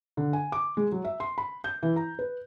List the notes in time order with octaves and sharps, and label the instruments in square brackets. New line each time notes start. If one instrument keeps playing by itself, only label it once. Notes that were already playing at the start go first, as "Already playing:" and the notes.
[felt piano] D3
G#5
D6
G#3
F#3
E5
C6
B5
G6
E3
A#5
B4